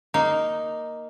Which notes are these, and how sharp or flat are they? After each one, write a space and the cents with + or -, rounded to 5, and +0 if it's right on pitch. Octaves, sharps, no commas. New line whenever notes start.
A#3 +0 D#4 +0